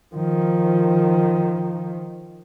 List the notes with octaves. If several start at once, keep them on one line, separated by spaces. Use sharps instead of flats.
D#3 F3